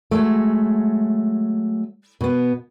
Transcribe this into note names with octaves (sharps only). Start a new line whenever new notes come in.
F#3 G#3 A3
B2 B3